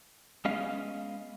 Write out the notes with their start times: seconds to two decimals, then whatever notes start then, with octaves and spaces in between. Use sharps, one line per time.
0.45 G#3 B3 C#4 D#5 F5